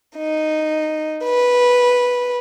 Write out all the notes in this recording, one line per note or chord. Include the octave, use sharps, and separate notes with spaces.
D#4
B4